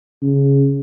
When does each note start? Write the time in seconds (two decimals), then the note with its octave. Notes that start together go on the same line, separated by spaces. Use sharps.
0.22 C#3